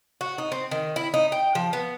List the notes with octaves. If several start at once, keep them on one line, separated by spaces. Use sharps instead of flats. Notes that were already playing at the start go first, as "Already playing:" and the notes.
F#4
D#4
C4
D#3
E4
D#4
G5
F3
B3